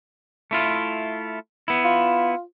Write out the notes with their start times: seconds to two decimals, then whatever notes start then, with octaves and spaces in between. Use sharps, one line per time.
0.51 A3 E4 F4
1.68 B3 E4
1.85 F4